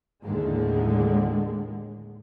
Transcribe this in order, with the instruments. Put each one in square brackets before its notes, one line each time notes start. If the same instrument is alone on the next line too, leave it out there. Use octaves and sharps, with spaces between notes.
[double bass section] D#2 A2 D3 G#3